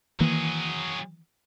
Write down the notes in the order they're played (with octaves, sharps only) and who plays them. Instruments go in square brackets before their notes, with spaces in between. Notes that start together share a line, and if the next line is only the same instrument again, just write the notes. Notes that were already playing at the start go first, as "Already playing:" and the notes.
[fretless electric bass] D#3 E3 A#3 [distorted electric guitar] F#3 G#4